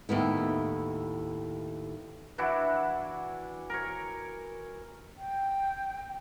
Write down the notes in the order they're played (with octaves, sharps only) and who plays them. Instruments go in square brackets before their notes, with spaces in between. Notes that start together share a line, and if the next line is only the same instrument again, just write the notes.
[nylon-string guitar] D#2 A2 B3 E4
[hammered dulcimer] E3 D4 E4 F#4
A#4 C#5
[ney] G5